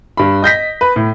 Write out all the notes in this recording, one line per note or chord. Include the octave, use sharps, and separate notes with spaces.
G2 B5
D#5 G6 A#6 B6
B4
A2